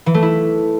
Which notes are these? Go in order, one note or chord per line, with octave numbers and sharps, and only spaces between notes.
E3
A3
E4